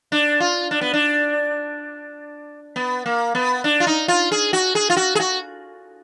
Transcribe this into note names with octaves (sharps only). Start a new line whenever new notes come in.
D4
F4
D4
B3
D4
B3
A#3
B3
D4
F4
D#4
F4
G#4
F#4
G#4
F4
F#4
G#4
F#4